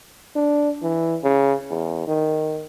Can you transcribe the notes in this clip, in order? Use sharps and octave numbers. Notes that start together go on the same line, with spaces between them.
D4
E3
C#3
E2
D#3